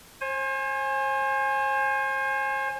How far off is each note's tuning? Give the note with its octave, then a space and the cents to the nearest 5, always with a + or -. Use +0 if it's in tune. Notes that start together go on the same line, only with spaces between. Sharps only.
C5 +40 G#5 +0